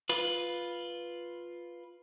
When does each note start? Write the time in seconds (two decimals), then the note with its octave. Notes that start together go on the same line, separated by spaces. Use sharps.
0.09 F4 B4